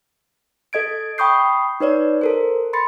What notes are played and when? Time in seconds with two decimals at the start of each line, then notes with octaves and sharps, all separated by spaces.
0.73 A4 D#5 G#6 D7
1.18 G5 B5 C#6 D#6 G6 C7
1.80 D#4 B4 C#5 D5
2.21 A4 A#4 C5
2.73 B5 C6 A6 C#7